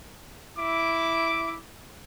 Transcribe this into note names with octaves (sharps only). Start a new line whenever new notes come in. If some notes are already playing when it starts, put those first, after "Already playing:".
E4 D6